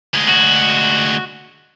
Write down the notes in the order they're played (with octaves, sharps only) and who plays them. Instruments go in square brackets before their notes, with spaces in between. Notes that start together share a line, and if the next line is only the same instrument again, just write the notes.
[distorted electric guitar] D2 G#3
[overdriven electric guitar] F#4